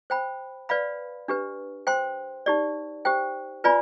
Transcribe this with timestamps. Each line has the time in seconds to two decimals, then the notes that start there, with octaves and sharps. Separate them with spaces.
0.10 C5 G5 B5
0.69 B4 D5 F5 B5
1.28 D4 G4 B4
1.87 C5 G5 C6
2.46 D#4 G4 D5
3.05 G4 C5 G5
3.64 F4 B4 D5 G#5 B5